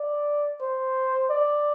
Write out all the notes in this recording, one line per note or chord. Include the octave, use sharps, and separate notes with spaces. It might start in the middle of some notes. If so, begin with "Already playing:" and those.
Already playing: D5
C5
D5